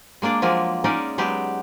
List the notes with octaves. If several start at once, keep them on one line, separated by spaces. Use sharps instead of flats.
G#3 A#3 D4 D5
F3 F#3 G#3 A#3 G#4 A#4
G#3 C#4 D#4 A#4 D5 D#5
F#3 G#3 B3 G4